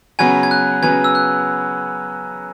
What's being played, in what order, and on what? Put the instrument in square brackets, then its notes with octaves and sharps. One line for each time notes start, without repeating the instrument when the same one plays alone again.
[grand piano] C#3 F#3 B3 F#4 B4 [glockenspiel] G#5 G#6
[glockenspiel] G#6
F#6
[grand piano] C#3 F#3 B3 F#4 B4 [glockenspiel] G#5 G#6
[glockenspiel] E6
F#6